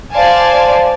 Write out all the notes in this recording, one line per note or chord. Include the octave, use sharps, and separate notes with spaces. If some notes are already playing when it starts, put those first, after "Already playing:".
C5 D5 F5 G#5 A5